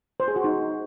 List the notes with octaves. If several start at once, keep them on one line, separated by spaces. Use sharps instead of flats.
C5
G#4
F#4
D#4